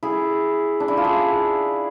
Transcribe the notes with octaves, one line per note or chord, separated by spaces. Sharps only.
E4 G#4
D4
E4
F4
E4 G#4